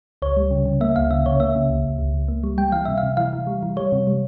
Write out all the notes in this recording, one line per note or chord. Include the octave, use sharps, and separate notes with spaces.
C#2 C#5
G3
C#3
C#3
A#3 E5
C#2 F5
C#3 E5
C#3 C#5
A#3 E5
C#3
C#2
C#2
C#2
C#2
A#3
G3
G3 G5
E3 F5
C3 E5
F5
C3
E3 F5
E3
G3
E3
G3 C#5
C3
G3